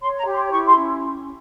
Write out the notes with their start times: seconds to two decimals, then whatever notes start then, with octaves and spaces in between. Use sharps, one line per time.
0.01 C#5 C6
0.18 A#5
0.26 G4
0.34 C6
0.50 E4 C#6
0.67 C6
0.76 C#4